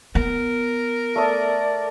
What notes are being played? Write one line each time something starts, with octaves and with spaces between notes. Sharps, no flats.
B3 A#4
A3 D5 D#6